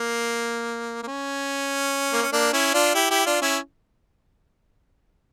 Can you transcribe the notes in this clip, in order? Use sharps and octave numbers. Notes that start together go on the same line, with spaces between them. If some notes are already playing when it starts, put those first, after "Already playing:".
Already playing: A#3
A#3
C#4
A#3
C#4
A#3 D4
C#4 E4
D4 F4
E4 G4
E4 G4
D4 F4
C#4 E4